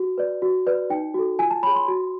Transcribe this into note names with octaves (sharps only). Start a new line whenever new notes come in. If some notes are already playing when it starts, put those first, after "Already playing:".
Already playing: F#4
B4 D5
F#4
B4 D5
D#4 G5
F#4 A4
F4 G#5
A5
G#4 C#5 B5
C6
F#4